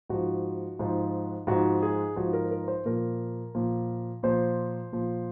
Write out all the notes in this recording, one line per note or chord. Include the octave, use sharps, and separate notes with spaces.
G#2 F3 F#4
G#2 F3
G#2 F3 F#4
G#4
G#2 F3 F#4
A#4
A#4
C5
A#2 F3 A#4
A#2 F3
A#2 F3 C5
A#2 F3